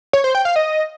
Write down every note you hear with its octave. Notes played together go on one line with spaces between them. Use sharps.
C#5
C5
G5
F5
D#5